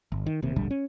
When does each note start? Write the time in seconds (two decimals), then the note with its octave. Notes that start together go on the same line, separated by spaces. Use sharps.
0.12 G1
0.26 D#3
0.42 D#1 D#2 C3
0.56 D1 A#1 D3 G3
0.71 C#4